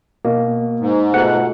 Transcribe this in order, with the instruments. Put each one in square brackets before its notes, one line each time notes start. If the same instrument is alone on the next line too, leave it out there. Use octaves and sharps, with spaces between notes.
[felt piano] B2 [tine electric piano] A#3
[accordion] G#2
[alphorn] B2 [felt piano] A3 F4 [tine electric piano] F#5 F#6